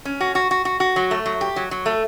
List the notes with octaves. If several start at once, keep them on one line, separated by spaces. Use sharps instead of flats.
C#4
F#4
F#4
F#4
F#4
F#4
F#3
A3
F#3
G4
F#3
F#3
A3